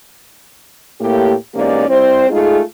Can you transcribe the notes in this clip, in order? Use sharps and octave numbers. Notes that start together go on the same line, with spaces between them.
A2 A#3 G4
E2 G#2 A#3 C#4 G4 D5
G3 C4 E4 C5
G#3 A3 D#4 F4 G#4